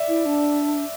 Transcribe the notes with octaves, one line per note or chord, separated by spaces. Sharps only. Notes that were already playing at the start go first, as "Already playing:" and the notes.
Already playing: D5 E5
E4
D4